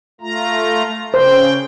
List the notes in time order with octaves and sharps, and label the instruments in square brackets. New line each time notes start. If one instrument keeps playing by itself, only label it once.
[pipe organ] A3 F4 A#5
[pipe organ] C#3 G5 [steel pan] C5